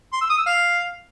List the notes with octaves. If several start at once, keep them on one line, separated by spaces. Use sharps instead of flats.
C6
E6
D#6
E6
F5